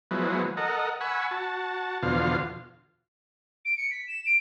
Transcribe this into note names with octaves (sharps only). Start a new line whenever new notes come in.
F3 F#3 G#3 B3 E4
A4 A#4 D#5 F#5
F#5 G#5 B5 C#6 E6
F#4 A5
E2 B2 D3 F3 F4 F5
D7
C#7
B6
E7
D7